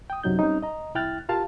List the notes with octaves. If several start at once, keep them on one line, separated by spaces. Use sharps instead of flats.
G5 D#6
C2 F#2 C3 F#3 D#4 G6
G3 C4 C#4 D#4
D#5 A#5
C2 E4 G5 F6 F#6 A6
F4 G4 A#4 F5 A5